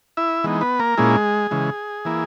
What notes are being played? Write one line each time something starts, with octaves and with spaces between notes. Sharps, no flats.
E4 E5
E3 G#3 B3 D#4
B3 B4
A#3 A#4
A#2 G#3 A#3 C#4 E4 G#4
C#3 E3 G#3
E3 A#3 E4